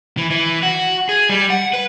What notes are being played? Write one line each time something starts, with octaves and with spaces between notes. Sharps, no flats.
E3
E3
F#4
G#4
G3
F#5
B4